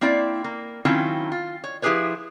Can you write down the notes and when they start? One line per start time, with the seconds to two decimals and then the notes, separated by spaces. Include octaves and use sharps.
0.01 A#3 C4 E4 D5
0.44 A#3
0.85 D#3 F#3 C4 C#4 E4 F4
1.32 F4
1.64 C#5
1.82 F3 E4 G4 G#4 B4 C#5